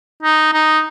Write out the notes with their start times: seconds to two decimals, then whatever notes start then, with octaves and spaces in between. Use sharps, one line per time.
0.23 D#4
0.53 D#4